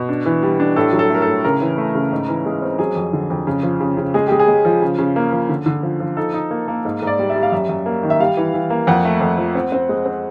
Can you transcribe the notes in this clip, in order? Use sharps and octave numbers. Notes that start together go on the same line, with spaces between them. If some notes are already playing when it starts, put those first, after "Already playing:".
Already playing: B2
D4
E3
G3
D4
A2 A4
F#3
A4
A3 A#4
A4
A2
C#3 A#4
E3
A3
C#3
G#2
E3
G#3
C4
F#3 G#4
F2
D3
F2
C#3
F3
C#3
C#3
G#3 G#4
G#3 G4
G#4
G#3
F3
C#3
C#3
A#3
F3
D3
D3
F3
F3
D#4 A4
D#4
A#3
A#3
G#2
G#2
D5
G3
E5
G3
F5
F#2 E5
F#2
A#3
D#3
E5
G3 F5
E3
E3
A#3
F2 F#5
A3
F2
F3
C4
C4
G#3
C4